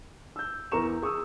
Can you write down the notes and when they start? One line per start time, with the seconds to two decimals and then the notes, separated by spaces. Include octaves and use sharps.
0.36 E6 G6
0.72 E2 A#4 A#5 C#6 E7
1.02 G#4 C#6 D#6 E6